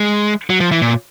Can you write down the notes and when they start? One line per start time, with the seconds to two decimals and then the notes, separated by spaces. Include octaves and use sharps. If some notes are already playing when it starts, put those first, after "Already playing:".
Already playing: G#3
0.50 F#3
0.61 F3
0.72 E3
0.82 A#2